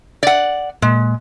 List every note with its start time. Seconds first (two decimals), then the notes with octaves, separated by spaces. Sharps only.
0.23 D5 F#5
0.82 A#2 G#3